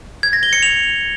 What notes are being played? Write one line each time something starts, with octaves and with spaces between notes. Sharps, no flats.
G#6
A#6
G7
C#7
F7